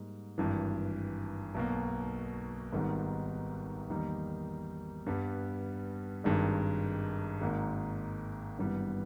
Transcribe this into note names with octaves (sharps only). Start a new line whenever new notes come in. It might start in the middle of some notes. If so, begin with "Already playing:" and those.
Already playing: G#2 G3 A#3
G#1 G2 E3
B1 B2 A#3
G#1 G#2 D#3 G3 B3
E2 D#3 G3 A#3 D#4
G2 G3 B3
G#1 G2 D#3 G#3
G#1 G#2 D#3 A#3
G#1 G2 E3 G3 B3